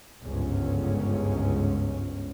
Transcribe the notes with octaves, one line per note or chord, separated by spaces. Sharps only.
G1 C#2 G#2 C#4